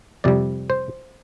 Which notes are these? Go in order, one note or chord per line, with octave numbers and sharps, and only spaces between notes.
F2 C3 G3 D5
C5